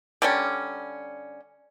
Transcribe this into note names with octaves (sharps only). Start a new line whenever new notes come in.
D3 G3 C#4